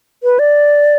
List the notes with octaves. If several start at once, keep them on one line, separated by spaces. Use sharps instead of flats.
B4
D5